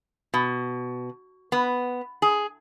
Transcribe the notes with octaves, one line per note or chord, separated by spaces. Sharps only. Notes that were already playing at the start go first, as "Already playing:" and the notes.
B2
B3
G#4